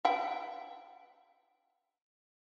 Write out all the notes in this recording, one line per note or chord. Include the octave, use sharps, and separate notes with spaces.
E5 F#5 G5